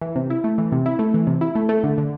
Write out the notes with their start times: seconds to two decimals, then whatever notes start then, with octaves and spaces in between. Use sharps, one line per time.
0.01 E3
0.16 C3
0.30 E4
0.44 A3
0.58 E3
0.72 C3
0.86 E4
0.99 A3
1.14 E3
1.27 C3
1.41 E4
1.55 A3
1.69 A3
1.84 D3
1.98 D3